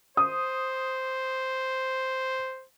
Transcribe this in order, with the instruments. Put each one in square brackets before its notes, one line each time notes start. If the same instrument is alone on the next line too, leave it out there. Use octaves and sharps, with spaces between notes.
[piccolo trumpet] C5 [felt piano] D#6